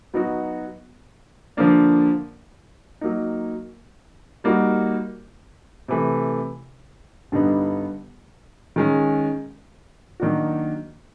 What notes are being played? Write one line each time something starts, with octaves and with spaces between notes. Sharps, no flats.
F#3 B3 D#4 F#4
D3 F3 A#3 D4
F#3 A#3 D#4
G3 A#3 D#4 F#4
C3 E3 A3
G2 D3 G3 B3 D#4
D#3 G#3 C#4
D#3 F#3 A#3 D4 F#4